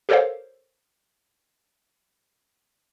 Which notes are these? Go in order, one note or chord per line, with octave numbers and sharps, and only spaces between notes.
G4 A4 A#4 C5 C#5 F5